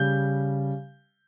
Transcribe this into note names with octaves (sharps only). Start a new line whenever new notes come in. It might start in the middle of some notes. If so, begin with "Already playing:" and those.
Already playing: C#3 G3 G6